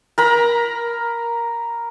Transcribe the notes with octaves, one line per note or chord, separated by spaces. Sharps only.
A#4 A#5 B5